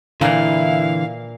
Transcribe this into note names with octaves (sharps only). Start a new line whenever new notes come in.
A#2 D3 E3 E4 F5